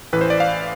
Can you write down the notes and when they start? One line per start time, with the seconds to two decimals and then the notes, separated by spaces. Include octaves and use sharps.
0.13 A1 A2 E3 B4
0.21 C5
0.30 D5
0.40 F5